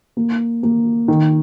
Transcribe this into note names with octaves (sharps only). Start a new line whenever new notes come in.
A#3
A#3
D#3